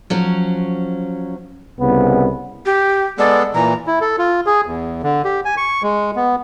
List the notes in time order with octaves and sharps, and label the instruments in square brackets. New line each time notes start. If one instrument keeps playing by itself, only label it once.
[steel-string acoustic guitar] F3 F#3 C#4
[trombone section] C2 C#3 B3
[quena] G4
[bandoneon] G#3 B3 A4 [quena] D5
[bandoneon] A#2 E3 [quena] A#5
[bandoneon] E4
A4
F4
G#4
E2
D3
G4
G#5
C#6
G#3
B3